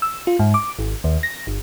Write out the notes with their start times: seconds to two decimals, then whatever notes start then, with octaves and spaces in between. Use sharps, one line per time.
0.02 E6
0.27 F4
0.39 G#2
0.54 D6
0.79 G#1
1.04 D#2
1.23 A#6
1.47 G1